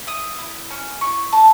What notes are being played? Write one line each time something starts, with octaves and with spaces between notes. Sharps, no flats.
E4 D#6
E4
C#4
E4 C#6
A4 A5